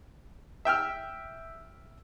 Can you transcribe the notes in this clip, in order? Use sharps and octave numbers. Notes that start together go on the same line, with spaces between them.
E5 G5 E6 F6